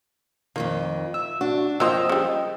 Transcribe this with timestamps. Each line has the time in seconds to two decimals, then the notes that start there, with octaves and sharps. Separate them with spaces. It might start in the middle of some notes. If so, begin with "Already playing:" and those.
0.56 F2 G#2 D#3 A#3
1.14 E5 E6
1.41 D4 F#4
1.80 F2 F3 F#3 A#3 F4 D#5 G5 E6
2.09 C#3 G3